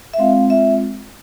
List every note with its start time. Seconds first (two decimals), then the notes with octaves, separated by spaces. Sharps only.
0.14 E5
0.18 G#3 C4 F4 F5
0.50 G#3 C4 F4 E5